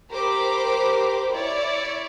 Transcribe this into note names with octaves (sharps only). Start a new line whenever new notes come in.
G4 A#4 C5 B5 D6
E4 C#5 D5